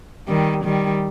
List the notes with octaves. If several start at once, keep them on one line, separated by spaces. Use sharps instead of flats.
D#3 G3
D#3 G3